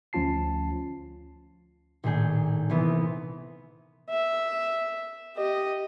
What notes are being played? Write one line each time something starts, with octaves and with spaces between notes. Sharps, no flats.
D2 F3 C#4 F4 A5 C7
A#1 A2 D#3 G#4 G6
C2 E3 B3
E5
G4 D#5